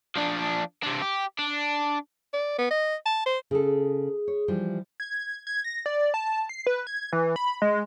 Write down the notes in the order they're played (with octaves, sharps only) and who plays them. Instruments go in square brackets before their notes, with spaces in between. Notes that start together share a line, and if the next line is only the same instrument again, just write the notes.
[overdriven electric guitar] F3 D4
C3 D4
G4
D4
[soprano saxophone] D5
B3
D#5
A5
C5
[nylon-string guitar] C#3 A4 [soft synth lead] G#4
[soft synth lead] G#4
[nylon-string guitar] C#5
E3 F3 G3
[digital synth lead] G#6
G#6
A#6
D5
A5
C7
B4
G#6
E3
B5
G#3